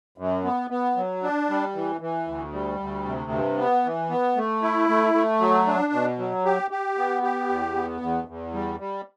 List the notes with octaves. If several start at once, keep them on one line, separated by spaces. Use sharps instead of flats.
F#2
B3
B3
F#3
D4
G3
E3
E3
D2
G3
D2
C3
G2
B3
E3
B3
A3
E4
A3
A3
F#3
D4
B2
F#3
G4
G4
B3
G4
E2
B3
E2
E2
G3
G3